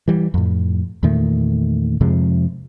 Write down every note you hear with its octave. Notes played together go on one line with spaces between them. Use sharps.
E3 G3
F2 A2
E2 A#2 D#3 A3
F2 C3 F3 G#3